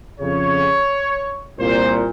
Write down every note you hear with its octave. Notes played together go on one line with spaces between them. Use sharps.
F2 C#3 C#5
C2 A#2 C5